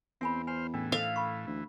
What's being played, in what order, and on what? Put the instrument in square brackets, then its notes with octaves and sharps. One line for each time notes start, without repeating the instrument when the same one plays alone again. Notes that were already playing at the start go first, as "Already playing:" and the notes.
[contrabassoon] E2 [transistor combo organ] C4 [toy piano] E5 G#5 B5
[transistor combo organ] C5 F6 [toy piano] G#5
[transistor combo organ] A2 E3 [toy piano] C#4 D4
[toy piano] A4 D#5 E6 [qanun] F5
[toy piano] B5 C#6
[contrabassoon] D2 [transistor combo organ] E3